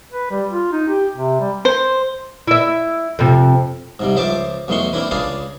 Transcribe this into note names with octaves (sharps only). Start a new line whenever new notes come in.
B4
G3
F4
D#4
G4
C3
G3
C5
E4 E5
F2 C3
G#2 C3 G3
C#2 F3 C5 E5 A5 D6
B1 E2 G#3 A3 C6 C#6
A#3 C4 D4 E4 B4
C#2 D4 G#4 B4 F5 A5